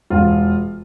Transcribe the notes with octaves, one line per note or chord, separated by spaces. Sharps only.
E1 F4